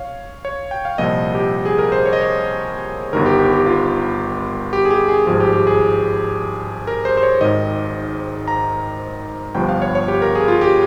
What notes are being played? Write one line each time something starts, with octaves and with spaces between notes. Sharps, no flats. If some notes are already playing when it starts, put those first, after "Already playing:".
Already playing: C#5 F5
C#5
G5
F5
C2 A#2 F3 D#5
G4
G#4
A#4
C5
C#5
D#5
C#5
G1 G2 D#3 A#4
G4
G4
G4
F4
G4
G#4
G4
G#4
G#1 G2 F3 G#4
G4
G4
G#4
A#4
C5
C5
C#5
G#1 G#2 D#3 D#5
A#5
G1 G2 F3 G5
F5
C#5
C#5
G4
A#4
G#4
F4
G4